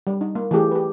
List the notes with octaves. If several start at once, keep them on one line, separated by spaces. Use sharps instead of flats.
G3
D#4
A#3
E3 A3 G4 G#4
G4 B4